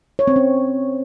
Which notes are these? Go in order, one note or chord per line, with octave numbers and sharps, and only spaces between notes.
C#5
C4
C#4